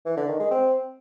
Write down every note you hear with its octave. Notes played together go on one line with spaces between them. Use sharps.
E3
D3
D#3
G#3
C4